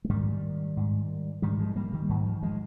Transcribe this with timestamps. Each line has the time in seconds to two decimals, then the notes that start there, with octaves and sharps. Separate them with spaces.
0.04 G#3
0.10 G#2 D#3 G3
0.77 G#2
1.42 G#2 D#3 G3
1.59 F3 G#3
1.76 G3 A#3
1.93 D#3 G3
2.09 G#2 D#3
2.26 F3
2.43 F3 G#3